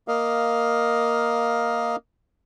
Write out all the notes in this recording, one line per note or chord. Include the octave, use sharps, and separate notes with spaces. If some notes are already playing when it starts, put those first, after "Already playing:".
A#3 A#4 D#5 F5